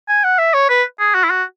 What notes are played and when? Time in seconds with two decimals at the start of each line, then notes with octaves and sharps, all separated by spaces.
0.09 G#5
0.24 F#5
0.39 E5
0.54 C#5
0.70 B4
1.00 G#4
1.15 F#4
1.24 E4
1.30 F#4